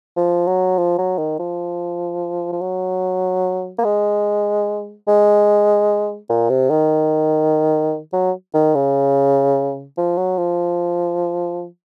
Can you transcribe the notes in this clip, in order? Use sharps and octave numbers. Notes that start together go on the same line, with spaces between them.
F3
F#3
F3
F#3
D#3
F3
F3
F#3
A#3
G#3
G#3
A#2
C3
D#3
F#3
D#3
C#3
F3
F#3
F3